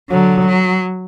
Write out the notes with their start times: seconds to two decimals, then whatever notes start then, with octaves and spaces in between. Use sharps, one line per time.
0.10 D3 F#3
0.46 F#3